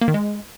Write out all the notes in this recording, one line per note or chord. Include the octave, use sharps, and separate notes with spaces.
A#3
D#3
G#3